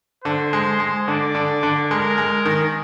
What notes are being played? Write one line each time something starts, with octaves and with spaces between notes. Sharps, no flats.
D3 C5
G#3
G#3
D3 D5
D3
D3
G#3 A#4
G#3
D#3